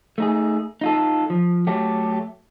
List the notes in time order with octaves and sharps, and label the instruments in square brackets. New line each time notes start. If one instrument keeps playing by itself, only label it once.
[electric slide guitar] A3 D#4 G#4
D#4 F4 A4
F3
F#3 A3 G4